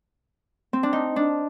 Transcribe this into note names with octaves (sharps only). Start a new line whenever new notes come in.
C4
D4
D#4
D4